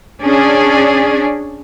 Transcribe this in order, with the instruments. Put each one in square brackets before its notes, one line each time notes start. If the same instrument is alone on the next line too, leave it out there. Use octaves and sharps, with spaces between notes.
[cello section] C#4 D4 G#4 D5